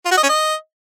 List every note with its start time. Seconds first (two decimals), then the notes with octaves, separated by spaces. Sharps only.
0.05 F4
0.11 F#4
0.17 D#5
0.23 C#4
0.29 D#5